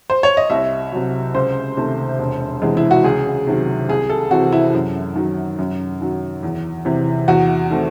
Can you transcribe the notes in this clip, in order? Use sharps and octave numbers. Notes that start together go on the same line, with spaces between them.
C5
C#5
D#5
C2 E5
C3 F#3
C#2 C5
C3 D#3 A3
E1
E2 C3 E3 G#3
E4
F#4
C#2 G#4
C3 D#3 F#3
C2 G#4
A4
C3 E3 C4 F#4
E4
F#2
D#3 F#3
F#2
D#3 F#3
E2
C3 E3
E2 F#4
D#3 A3 C4